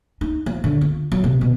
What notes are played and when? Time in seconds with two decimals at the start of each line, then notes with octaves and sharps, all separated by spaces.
0.21 D#4
0.46 F3
0.64 D3
0.81 F4
1.12 F#3
1.24 C3
1.41 B2